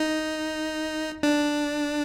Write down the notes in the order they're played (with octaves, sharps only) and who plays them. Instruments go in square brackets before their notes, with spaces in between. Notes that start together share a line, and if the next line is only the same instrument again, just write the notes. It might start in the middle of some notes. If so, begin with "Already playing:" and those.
Already playing: [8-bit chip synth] D#4
D4